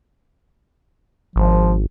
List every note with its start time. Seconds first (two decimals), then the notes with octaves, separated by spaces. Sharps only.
1.36 G#1 F3